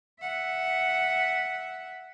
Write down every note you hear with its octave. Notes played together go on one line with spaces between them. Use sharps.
E5 F#5